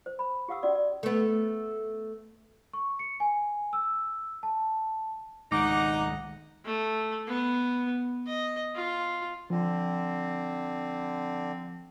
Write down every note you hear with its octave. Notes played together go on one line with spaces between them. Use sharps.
C5
B5
G4 F5 F#5 D#6 E6
C#4 F#4 D5
D5
A3 B3
C#6
C#7
G#5
E6
A5
C#2 D#3 G#3 D#4 F#5 D6
A3
B3
D#5
F4
D3 F3 C4